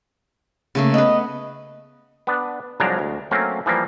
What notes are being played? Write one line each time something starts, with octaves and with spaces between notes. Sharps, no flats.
C#3 A3 A#3
B3 B4 D#5
B3 D4
C2 F3 F#3 G#3 D4 A#5
D2
F#3 A3 A#3 C4 C#4
E3 F3 G3 A#3